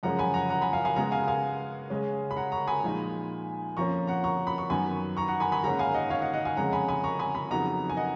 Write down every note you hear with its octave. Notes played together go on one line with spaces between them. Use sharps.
F#2 C#3 F3 G#3 C#4 F#5 A#5
G#5 B5
F#5 A#5
F#5 A#5
G#5 B5
F5 G#5
F5 G#5
C#3 G#3 B3 F#5 A#5
F5 G#5
F5 G#5
C#3 G#3 C#4
B5
F#5 A#5
A#5 C#6
G#5 B5
A#2 F3 G#3 D#4
F2 F3 A#3 C#4 A#5 C#6
F#5 A#5
A#5 C#6
B5
C#6
F#2 D#3 F#3 B3 G#5 B5
A#5 C#6
F#5 A#5
G#5 B5
G#5 B5
G#2 D#3 A#3 C#4 F#5 A#5
F5 G#5
D#5 F#5
C#5 F5
D#5 F#5
D#5 F#5
F5 G#5
F2 C#3 G#3 C#4 F#5 A#5
G#5 B5
G#5 B5
A#5 C#6
G#5 B5
G#5 B5
F2 C#3 F#3 B3 D#4 F#5 A#5
G#5
D#5 F#5